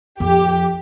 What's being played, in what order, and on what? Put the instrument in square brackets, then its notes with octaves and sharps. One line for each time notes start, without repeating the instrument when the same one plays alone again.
[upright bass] F2 [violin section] G4